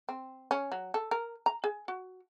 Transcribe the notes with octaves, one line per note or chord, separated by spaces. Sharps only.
C4
C#4
F#3
A4
A#4
A#5
G#4
F#4